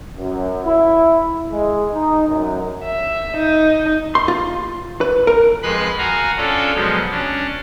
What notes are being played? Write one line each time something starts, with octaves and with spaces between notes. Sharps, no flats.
F#2
E4
G#3
D#4
F#2
E5
D#4
C6
F4
B4
A#4
F2 G#3 B4 B5 C6 F#6
F#4 F5 G#5 A#5
C#4 D4 F4 A4
B2 F3 F#3 G#3
C#4 D4